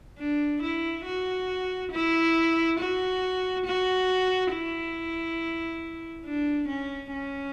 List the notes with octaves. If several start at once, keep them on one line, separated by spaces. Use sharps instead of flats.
D4
E4
F#4
E4
F#4
F#4
E4
D4
C#4
C#4